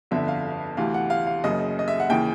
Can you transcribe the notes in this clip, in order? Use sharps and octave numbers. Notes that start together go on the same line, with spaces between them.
G1 F2 D3 E5
F5
D2 C3 E3 F5
F#5
F5
F5
F#1 F#2 C#3 D#5
D#5
E5
F#5
D#2 C#3 E3 G5